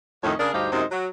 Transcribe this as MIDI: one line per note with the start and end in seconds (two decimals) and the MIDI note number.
0.24 0.35 41
0.24 0.35 45
0.24 0.35 51
0.24 0.35 61
0.24 0.35 63
0.24 0.35 73
0.40 0.53 49
0.40 0.53 62
0.40 0.53 68
0.40 0.53 70
0.54 0.68 38
0.54 0.68 43
0.54 0.68 63
0.54 0.68 67
0.54 0.68 72
0.54 0.68 77
0.72 0.84 42
0.72 0.84 48
0.72 0.84 56
0.72 0.84 60
0.72 0.84 63
0.72 0.84 70
0.92 1.08 54